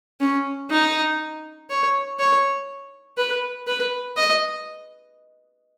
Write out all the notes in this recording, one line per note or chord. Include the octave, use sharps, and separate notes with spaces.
C#4
D#4
C#5
C#5
B4
B4
D#5